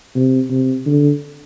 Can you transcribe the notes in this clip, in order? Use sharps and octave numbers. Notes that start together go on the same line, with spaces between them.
C3
C3
D3